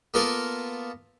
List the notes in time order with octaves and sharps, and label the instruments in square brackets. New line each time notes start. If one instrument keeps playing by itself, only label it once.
[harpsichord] A#3 B3 F4 A4 A#4